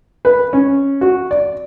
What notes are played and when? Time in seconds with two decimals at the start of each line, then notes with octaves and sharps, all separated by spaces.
0.25 B4
0.53 C#4
1.01 F#4
1.31 D5